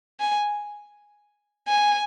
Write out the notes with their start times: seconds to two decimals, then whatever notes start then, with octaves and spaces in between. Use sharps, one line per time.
0.20 G#5
1.68 G#5